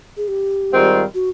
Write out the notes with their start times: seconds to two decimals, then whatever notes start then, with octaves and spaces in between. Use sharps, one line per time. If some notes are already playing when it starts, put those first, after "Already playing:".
0.17 G#4
0.28 G4
0.72 G#2 D#3 G3 C4 F4
1.15 F#4